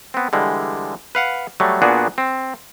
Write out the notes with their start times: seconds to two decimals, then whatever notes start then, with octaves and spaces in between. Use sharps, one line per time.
0.14 B3 C4
0.33 D3 E3 G3 G#3
1.15 B4 F5 F#5
1.60 F#3 G3 A3
1.82 A#2 B3 D4 F#4 G#4
2.18 C4